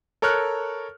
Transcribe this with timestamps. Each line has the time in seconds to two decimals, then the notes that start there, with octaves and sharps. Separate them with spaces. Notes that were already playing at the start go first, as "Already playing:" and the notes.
0.22 A4 A#4 C#5 C#6 F6 F#6